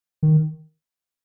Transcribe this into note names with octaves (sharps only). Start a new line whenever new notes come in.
D#3